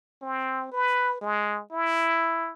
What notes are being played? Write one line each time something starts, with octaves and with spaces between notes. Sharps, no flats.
C4
B4
G#3
E4